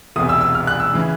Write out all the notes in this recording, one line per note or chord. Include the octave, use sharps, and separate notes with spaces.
E1 E2 C3 D#6
E6
E6
F6
F#6
E6
C#3 E3